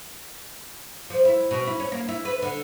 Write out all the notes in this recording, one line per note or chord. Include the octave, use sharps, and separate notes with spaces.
F3
E4
B2
E4
C#4
A#3
E4
B4
D3